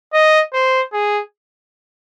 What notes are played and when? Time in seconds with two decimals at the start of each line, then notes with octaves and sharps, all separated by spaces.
0.13 D#5
0.53 C5
0.93 G#4